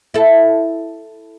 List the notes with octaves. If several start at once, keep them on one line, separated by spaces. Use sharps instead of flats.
E4 A4